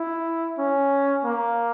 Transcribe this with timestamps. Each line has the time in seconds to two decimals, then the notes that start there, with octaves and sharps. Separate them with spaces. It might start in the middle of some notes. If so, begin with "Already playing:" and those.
Already playing: E4
0.58 C#4
1.25 A#3